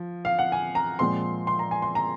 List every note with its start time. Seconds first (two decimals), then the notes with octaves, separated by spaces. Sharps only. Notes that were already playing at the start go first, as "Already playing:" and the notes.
Already playing: F3
0.25 F5
0.39 F#5
0.52 G#5
0.75 A#5
0.99 A#2 F3 G#3 C4 C6
1.47 C6
1.59 A#5
1.71 G#5
1.82 C6
1.95 A#5